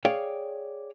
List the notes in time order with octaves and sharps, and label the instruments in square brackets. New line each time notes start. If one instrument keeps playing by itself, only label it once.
[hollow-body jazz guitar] G#4 C#5 D5 F5 G5